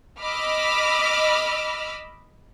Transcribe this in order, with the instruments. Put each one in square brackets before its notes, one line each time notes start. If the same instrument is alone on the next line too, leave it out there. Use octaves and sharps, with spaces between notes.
[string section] D#5 B5 D6 E6 F6